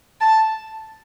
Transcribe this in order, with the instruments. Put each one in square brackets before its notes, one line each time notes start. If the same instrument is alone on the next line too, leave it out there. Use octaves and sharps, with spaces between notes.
[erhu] A5